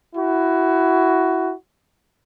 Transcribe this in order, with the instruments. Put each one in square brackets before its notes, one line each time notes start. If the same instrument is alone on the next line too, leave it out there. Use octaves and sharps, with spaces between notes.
[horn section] E4 F#4